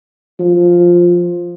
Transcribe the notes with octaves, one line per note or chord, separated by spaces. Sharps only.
F3